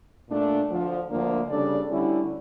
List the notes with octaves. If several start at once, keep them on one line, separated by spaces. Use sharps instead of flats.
A#2 A3 D4
D2 D3 F3
D2 D3 F3 A#3 D4
C#3 G3 D4 A4 D5
D2 D3 G3 C#4 E4